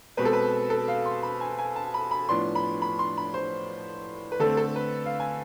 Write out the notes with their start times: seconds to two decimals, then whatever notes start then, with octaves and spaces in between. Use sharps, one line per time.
0.17 B2 G#3 C4 B4
0.25 A4
0.33 B4
0.70 A4
0.88 F5
1.06 C6
1.23 B5
1.41 G#5
1.58 G#5
1.76 A5
1.94 B5
2.11 B5
2.29 A2 F3 B3 D4 C6
2.55 B5
2.82 B5
2.99 C6
3.18 B5
3.34 C5
4.32 B4
4.40 D3 A3 C4 A4
4.57 A4
4.76 B4
5.06 F5
5.20 G#5